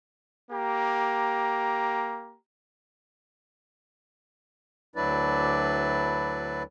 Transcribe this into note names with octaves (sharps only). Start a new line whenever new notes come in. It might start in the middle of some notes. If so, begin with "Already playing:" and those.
A#3 G4 A#5
D2 F#3 D4 E4 B4 D5